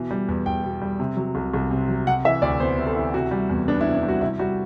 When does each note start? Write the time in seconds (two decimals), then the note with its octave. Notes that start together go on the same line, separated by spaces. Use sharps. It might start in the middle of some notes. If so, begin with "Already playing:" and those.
Already playing: B2 E3
0.11 G3
0.28 E2
0.46 E2 G5
0.64 B2
0.82 G3
1.00 C3
1.17 F#3
1.35 C2
1.53 C2
1.71 C3
1.88 F#3
2.07 C3 F#5
2.25 E3 E5
2.42 D2 D5
2.60 B3 C5
2.78 C3
2.87 A4
2.96 E3
3.14 C3 F#4
3.31 G3
3.49 E2
3.68 B3 D4
3.81 E4
3.86 C3
3.94 D4
4.03 G3
4.09 F#4
4.21 C3 E4
4.39 G3 F#4